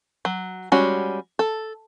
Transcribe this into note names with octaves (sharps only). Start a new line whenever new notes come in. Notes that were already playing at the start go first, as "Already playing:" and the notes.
F#3
G3 G#3 C#4 F#4
A4